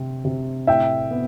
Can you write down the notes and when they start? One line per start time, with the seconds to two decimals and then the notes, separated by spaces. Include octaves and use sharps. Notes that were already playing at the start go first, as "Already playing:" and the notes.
Already playing: C3 C4
0.25 C3
0.67 A2 E5 G5
1.11 B3